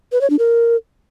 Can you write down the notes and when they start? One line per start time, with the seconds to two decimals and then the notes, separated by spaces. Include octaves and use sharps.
0.12 B4
0.21 C#5
0.30 D4
0.39 A#4